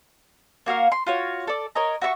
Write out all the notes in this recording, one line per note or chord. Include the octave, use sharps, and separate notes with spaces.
A#3 F#4 A#4 F5
C6
F4 F#4 C#5
A4 D5
A#4 C#5 D#5 A#5
F#4 E5 A#5 C#6